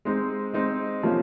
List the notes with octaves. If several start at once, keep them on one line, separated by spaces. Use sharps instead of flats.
G#3 C4 D#4
G#3 C4 D#4
C3 F3 A#3 C#4 F4